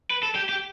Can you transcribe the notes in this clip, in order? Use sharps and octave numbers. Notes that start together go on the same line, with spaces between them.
B4
A4
G4
G4